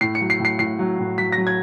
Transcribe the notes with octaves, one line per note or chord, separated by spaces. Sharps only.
A2 C7
C#7
F#3
C7
A2
C7
A2 C7
F#3
A2
F#3 B6
A#6
F#3
G#6